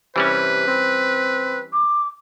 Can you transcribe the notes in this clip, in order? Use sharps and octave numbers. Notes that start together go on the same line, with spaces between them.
C3 E3 G3 C#4 B4
C4
D6